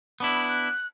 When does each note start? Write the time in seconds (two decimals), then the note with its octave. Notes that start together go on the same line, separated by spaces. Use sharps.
0.20 B3 D4 E4
0.35 B5
0.48 F#6